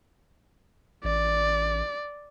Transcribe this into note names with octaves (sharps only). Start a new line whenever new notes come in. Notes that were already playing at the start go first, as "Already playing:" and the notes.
A1 D5